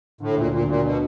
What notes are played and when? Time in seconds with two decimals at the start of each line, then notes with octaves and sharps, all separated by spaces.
0.20 A2 D3
0.37 D2 A#2
0.52 A#2 D3
0.67 A#2 F#3
0.83 B2 D3